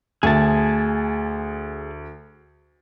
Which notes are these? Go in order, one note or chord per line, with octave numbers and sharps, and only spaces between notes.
D2 G#4 A5